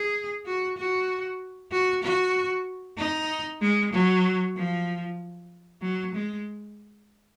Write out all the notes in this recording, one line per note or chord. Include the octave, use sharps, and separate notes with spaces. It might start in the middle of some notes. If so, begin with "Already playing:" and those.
Already playing: G#4
F#4
F#4
F#4
F#4
D#4
G#3
F#3
F3
F#3
G#3